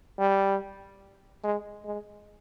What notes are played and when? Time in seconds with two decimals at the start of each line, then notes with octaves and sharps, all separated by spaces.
0.19 G3
1.43 G#3
1.85 G#3